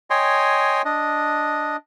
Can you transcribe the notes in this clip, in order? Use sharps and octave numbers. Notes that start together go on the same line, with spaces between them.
C#5 D#5 G5 G#5 C6
D4 D#5